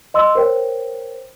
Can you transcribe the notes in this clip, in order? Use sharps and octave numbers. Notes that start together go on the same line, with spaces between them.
D#5 C6 E6
A#4 C5 C#5 G5